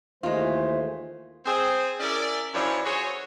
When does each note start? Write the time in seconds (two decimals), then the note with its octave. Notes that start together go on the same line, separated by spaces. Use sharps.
0.23 D#2 E3 G#3 A3 F4 C5
1.46 C4 G#4 C5
2.00 C#4 E4 G#4 A#4 D5
2.53 F#2 E3 F3 D4 F4 C#5
2.85 F#4 G#4 C5 C#5